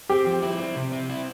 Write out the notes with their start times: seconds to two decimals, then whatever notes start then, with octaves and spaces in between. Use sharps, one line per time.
0.09 C4 G4
0.26 F3
0.42 E4
0.59 C4
0.76 C3
0.92 C4
1.09 E4